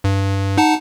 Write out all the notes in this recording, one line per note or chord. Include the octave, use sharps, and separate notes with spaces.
G2
D#4 F#5 A5